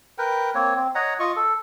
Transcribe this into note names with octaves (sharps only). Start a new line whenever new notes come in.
A#4 B4 G5
A#3 C4 C#5
C4
C#5 D#5 F#5 A#5
F4 D#5 C#6
A4